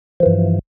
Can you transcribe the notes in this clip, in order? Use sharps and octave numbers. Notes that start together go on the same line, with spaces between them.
G2 E3 F3